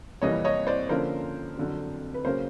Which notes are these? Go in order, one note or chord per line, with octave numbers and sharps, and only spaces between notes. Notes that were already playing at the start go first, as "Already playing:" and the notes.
F2 C3 E3 G3 A#3 C#5 D#5
C#5 D#5
C5 D5
D3 F3 A#3 C#4 A#4 C5
F2 D3 F#3
B4
C#3 F#3 A#3 C#4 A#4 C5